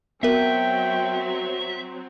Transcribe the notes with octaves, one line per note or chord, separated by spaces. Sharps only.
F#3 B3 C4 A#4 E5 G5